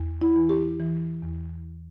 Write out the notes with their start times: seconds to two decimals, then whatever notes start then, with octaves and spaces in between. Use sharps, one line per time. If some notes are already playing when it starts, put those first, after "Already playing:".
Already playing: E2
0.21 E4
0.36 E3
0.49 G4
0.79 E3
1.22 E2